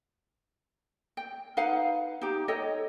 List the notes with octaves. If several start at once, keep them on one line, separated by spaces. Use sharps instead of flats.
G5
D#4 B4 F5 F#5
D#4 G4
A4 C#5 D#5 G5